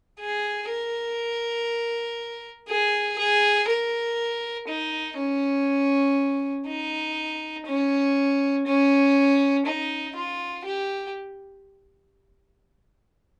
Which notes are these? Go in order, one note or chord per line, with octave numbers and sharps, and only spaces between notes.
G#4
A#4
G#4
G#4
A#4
D#4
C#4
D#4
C#4
C#4
D#4
F4
G4